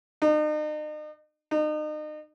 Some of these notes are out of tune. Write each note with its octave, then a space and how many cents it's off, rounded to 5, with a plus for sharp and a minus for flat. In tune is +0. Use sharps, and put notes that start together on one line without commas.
D#4 -40
D#4 -35